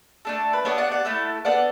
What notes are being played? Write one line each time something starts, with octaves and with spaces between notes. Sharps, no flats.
A3 D4 A4
B4
B3 D4 G4 A4 C#5
D5 F#5
D5 F#5
A3 E4 A4
B3 D4 A4 D5 F#5